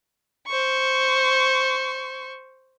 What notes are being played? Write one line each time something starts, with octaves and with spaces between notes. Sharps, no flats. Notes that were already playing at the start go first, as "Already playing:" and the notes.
C5 C#6